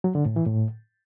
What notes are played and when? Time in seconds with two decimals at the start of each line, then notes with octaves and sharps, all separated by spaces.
0.04 F#3
0.15 D3
0.26 A2
0.36 E3
0.47 A2